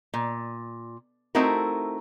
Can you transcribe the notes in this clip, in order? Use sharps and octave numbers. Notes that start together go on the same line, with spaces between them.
A#2
A3 C4 D#4 E4 F#4 A#4